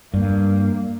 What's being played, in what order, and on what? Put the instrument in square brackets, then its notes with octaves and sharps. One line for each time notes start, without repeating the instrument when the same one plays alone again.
[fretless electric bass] G2 [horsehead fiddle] A#3